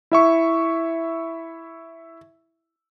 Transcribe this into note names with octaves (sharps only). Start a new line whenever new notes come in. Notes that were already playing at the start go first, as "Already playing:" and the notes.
E4 E5 C#6